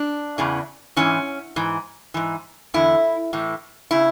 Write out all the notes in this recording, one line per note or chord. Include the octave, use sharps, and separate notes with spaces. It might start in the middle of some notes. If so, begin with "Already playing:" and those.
Already playing: D4
E2 C#3 E3
G#2 E3 C#4
G#2 E3
G#2 E3
E2 D3 E4
A2 E3
C#3 E4